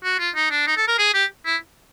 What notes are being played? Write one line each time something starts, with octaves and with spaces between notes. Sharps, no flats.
F#4
F4
D#4
D4
D#4
A4
A#4
G#4
G4
E4